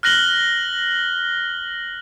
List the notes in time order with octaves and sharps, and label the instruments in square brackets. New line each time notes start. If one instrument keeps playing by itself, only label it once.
[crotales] F6 F#6 A#6 F#7 G7